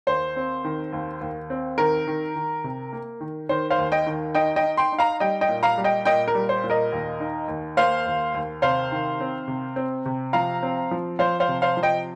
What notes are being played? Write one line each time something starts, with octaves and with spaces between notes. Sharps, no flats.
D#2 C5
C4
D#3
D#2
D#2
C4
D#3 A#4
D#3
D#3
C3
A#3
D#3
D#3 C5
C5 F5
D#2
D#5 G5
D#3
D#4 D#5 G5
D#5 G5
D#4
G5 C6
D#4
F5 A#5
G3 D#5 G5
D#5 G5
A#2
F5 A#5
G3
D#5 G5
A#2 D#5 G5
A#4
G3
C5
A#2
A#4 D#5
D#2
D#4
D#2
A#3 C5 F5
D#2
D#2
C3 C5 F5
D#3
C4
C3
C4
C3
F3 F5 A#5
C4
F3
F3 C5 F5
C5 F5
C3
C5 F5
F3
D#5 G5